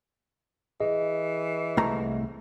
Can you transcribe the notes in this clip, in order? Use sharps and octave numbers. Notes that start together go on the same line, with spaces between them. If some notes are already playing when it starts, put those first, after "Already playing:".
E3 G#4 D#5
C2 A3 A#5